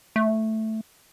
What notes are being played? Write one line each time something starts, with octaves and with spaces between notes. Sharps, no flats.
A3